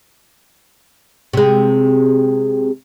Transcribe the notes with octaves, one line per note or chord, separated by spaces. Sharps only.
C3 G#3